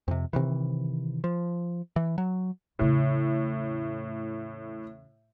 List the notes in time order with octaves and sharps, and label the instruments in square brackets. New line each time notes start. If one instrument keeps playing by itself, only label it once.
[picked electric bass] F2 C3
C3 D#3 E3
F3
E3
F#3
[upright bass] E2 C#3 [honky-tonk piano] A2